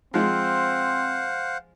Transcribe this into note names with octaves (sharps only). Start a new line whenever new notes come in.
F3 G#3 C4 C5 F5 F#5